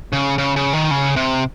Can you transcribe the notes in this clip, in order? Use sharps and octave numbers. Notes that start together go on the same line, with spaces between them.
C#3
C#3
C#3
D#3
C#3
C3